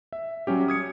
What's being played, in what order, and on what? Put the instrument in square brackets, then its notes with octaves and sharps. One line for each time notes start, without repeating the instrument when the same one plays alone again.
[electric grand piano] E5
F#3 G3 C#4 G4
D#6 G#6 C#7